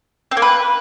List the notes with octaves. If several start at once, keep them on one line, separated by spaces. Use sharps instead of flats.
C4
A#3
B4